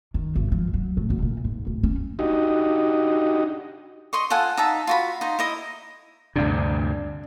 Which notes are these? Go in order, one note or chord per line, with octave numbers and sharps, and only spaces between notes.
D#3
G#1
F3
F#3
A2
F#1
A#2
G#2
D1
C#4
D4 D#4 F#4 G4 D#5
D#5 C6 C#6
F4 A4 F#5 G#5
D#4 E5 A5
F4 F#4 B5
D#4 C5
E4 D#5 D#6
D2 G2 C3 D4